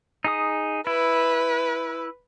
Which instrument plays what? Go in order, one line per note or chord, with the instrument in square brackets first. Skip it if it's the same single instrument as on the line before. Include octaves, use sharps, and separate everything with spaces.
[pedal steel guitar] D#4 G#4 D#6
[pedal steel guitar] E4 [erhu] B4